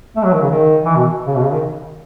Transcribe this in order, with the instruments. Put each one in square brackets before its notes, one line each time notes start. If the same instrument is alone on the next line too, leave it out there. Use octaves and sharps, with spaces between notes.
[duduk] A3
F#3
D#3
C#3
D#3
E3
B2
C#3
B2
C#3
D#3